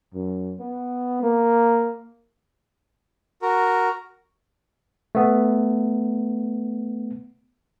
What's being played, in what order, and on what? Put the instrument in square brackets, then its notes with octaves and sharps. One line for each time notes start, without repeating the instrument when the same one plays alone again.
[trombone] F#2
B3
A#3
[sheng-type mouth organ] F#4 A#4
[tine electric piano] A3 B3